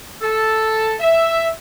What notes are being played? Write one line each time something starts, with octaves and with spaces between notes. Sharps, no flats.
A4
E5